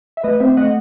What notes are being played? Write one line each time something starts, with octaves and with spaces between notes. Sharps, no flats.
E5
A3 B4 D#5
C4 C5 E5
A3 D#5 F#5